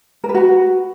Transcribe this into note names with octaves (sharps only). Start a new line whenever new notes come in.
A#4
B4
F#4